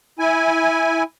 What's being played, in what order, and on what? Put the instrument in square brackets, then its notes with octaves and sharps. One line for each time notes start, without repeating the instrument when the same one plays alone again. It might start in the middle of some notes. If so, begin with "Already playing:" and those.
[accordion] E4 G#5